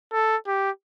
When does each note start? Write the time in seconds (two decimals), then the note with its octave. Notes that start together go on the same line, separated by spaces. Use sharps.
0.12 A4
0.47 G4